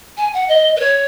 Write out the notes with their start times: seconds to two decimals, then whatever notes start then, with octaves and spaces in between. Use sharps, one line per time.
0.17 G#5
0.34 F#5
0.48 D#5
0.76 B4
0.80 C#5